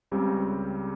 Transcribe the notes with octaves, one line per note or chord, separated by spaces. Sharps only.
C#2 C#3 G3 C4 G4